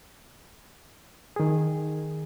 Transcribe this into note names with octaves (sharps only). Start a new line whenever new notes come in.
D#3 G#4